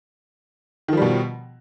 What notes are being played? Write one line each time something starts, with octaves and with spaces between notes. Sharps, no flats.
B2 D#3 F3 G3